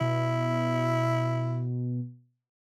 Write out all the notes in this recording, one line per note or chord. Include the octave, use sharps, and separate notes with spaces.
B2 E4